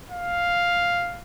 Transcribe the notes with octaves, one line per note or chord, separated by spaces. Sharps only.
F5